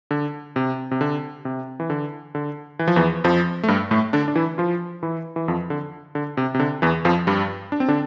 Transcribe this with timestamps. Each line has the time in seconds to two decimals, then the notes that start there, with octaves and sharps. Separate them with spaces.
0.11 D3
0.56 C3
0.91 C3
1.01 D3
1.45 C3
1.80 E3
1.90 D3
2.35 D3
2.79 E3
2.88 F3
2.96 E2 E3
3.24 F2 F3
3.63 A3
3.68 G2 G3
3.91 A2 A3
4.13 D3 D4
4.28 D4
4.35 E3 E4
4.58 F3 F4
5.03 E3 E4
5.36 E3
5.48 F2 F3
5.70 D3
6.15 D3
6.37 C3
6.54 C3
6.59 D3
6.82 E2 E3
7.05 F2 F3
7.27 G2 G3
7.72 D4
7.80 C4
7.88 D3 D4